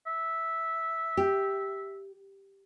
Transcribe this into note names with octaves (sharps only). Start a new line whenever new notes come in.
E5
G4